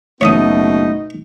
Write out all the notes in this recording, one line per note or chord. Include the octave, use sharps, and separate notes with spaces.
F#1 B2 A3 B3 D#4 C#5 D#5 D#6